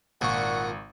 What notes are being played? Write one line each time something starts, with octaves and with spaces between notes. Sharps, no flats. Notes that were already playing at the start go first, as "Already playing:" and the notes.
G#1 A#2 F#5 C#6